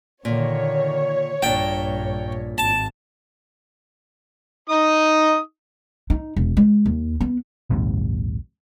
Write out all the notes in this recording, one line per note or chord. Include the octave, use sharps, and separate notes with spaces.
A#2 D3 D#3 C#5
A#1 G2 A#2 D4 G5
G#1 A5
D#4 D#6
D#4
E1
G#3
D#2
B3
A#1 D#2 G#2 C3